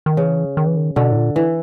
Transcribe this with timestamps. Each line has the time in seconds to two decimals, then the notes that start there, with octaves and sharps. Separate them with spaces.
0.06 D#3
0.17 C#3 E3
0.57 D#3
0.67 E3
0.76 D#3
0.96 B2 D3
1.12 A2
1.17 A#2
1.36 E3